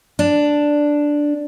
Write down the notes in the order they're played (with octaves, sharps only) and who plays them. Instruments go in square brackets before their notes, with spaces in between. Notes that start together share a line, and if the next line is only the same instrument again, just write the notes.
[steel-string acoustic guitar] D4